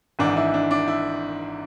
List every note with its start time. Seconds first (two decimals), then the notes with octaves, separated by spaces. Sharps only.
0.19 G#1 G#2 E3 D4
0.37 E4
0.54 D4
0.71 D4
0.88 E4